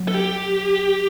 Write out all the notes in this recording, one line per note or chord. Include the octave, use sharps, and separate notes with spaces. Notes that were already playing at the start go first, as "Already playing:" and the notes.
Already playing: F#3
A4
G4